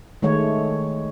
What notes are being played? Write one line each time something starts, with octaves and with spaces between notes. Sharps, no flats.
D#3 G#3 A3 C#5